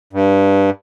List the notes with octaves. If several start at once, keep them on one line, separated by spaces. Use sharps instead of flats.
G2